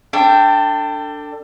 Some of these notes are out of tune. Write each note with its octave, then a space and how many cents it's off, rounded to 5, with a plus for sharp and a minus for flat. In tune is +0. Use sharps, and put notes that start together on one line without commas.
D4 +0 A4 +25 G5 +0